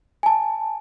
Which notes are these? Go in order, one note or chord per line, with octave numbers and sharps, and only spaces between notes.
G#5 A5